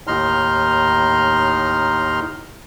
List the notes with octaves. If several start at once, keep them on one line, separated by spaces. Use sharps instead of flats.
D#2 A2 D#4 A#5 C6 F6